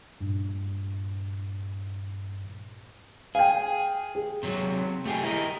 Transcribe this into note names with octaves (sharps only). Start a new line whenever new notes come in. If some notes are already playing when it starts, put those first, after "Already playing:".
G2 A#2
G#4 F5 G5
G#4
C3 F#3
A3 G4 G#4
E4 A#4 D#5